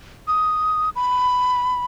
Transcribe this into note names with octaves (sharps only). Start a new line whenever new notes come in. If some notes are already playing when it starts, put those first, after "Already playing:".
D#6
B5